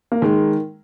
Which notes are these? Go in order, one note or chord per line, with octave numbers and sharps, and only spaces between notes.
A#3
D#3 G#3